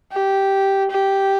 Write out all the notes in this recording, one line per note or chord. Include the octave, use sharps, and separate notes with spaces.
G4
G4